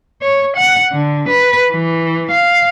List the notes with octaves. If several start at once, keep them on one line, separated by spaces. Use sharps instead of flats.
C#5
F#5
D3
B4
E3
F5